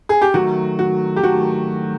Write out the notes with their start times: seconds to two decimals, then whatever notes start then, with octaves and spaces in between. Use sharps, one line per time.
0.09 G#4
0.21 G4
0.34 D#3 F#3 A3 F#4
0.79 F#4
1.16 G4
1.23 D#3 F#3 A3 F#4